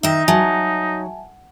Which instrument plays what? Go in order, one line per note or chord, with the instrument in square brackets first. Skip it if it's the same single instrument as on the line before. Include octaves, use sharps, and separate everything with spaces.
[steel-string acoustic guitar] D#3 E5 [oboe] D#4
[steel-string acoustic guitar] F#3 [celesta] E5 G#5 A5